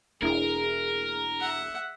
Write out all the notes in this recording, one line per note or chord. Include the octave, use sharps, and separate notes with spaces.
E1 A#3 D4 E4 G#4 A#4
E5 F#5